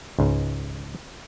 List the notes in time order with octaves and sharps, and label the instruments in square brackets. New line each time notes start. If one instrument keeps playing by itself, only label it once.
[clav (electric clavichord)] C#2 G#2